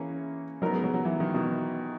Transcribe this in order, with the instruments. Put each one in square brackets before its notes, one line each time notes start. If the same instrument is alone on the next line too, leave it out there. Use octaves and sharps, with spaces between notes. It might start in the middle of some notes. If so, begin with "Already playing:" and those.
Already playing: [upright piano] E3 [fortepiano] A#3 C#4 G#4
[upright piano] F#3 [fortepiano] B3 D#4 A#4 D#5
[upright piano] G#3
F#3
F#3
E3
D#3
B2